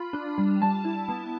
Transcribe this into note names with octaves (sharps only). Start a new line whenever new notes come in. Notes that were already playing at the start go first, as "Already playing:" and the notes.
Already playing: F4 B5
D4
G3
G3 A5
E4
B3